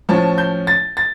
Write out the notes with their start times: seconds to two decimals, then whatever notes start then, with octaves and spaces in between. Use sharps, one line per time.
0.09 A2 F3 C#4 A5
0.38 G6
0.67 A6
0.97 A6